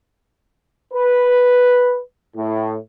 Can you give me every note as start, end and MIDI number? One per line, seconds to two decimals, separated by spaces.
0.94 2.00 71
2.36 2.76 45